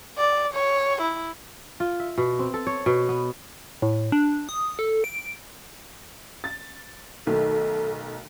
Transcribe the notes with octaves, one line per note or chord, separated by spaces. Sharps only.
D5
C#5
E4
F4
E5
B2
C4
A4
C#5
B2
B3
A2
D4
D#6
A4
D7
A6
B1 D#3 A3 A4